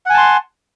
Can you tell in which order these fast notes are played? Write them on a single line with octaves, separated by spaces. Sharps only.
F#5 G#5 A5 C6